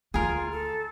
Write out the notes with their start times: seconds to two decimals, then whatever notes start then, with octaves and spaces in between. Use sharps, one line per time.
0.14 D2 F4 G#4 A#4
0.51 A4